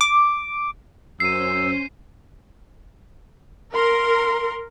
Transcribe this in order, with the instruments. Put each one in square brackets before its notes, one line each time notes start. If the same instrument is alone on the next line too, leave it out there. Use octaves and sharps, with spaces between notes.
[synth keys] D6
[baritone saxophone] F#2 [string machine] C#4 C5 [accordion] E6 [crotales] C7 D#7
[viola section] A#4 [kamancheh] C6